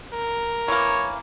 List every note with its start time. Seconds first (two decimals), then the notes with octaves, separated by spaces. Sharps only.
0.13 A#4
0.68 E3 A#3 C#5